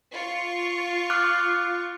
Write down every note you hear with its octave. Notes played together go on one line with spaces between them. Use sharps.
F4 C#6
D6 F6 F#6